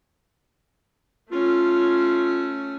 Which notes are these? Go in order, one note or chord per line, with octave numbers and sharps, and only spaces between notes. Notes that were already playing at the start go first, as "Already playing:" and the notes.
A3 C#4 F4